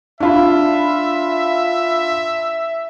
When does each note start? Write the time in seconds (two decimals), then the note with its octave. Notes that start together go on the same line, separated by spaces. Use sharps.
0.20 D4 F4 E5 B5